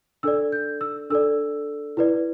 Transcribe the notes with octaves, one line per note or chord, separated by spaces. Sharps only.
D4 A4 D5 E6
G6
E6
D4 A4 D5 E6
E4 B4 D5